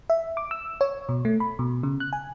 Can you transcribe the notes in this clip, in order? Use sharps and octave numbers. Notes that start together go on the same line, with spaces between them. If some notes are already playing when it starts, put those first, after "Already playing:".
E5
D6
E6
C#5
B2
A3
B5
B2
C#3
F#6
G#5